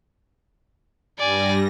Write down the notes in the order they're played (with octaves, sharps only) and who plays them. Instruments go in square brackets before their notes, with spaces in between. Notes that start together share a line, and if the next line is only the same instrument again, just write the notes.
[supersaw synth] G2 G3 A#6 [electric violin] D5 G#5